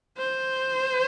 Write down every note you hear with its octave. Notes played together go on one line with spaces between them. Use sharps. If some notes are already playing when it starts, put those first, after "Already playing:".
C5